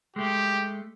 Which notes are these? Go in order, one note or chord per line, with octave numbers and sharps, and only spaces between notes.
G#3 A3 G4